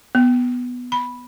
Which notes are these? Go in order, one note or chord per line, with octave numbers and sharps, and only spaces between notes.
B3
B5